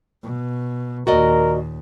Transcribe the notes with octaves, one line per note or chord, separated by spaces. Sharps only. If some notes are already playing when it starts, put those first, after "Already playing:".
B2
D#2 A#2 F#4 A#4 D5 D#5